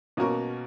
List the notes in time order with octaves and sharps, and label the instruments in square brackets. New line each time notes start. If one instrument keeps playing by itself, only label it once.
[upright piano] B2 A#3 C#4 F#4 A#4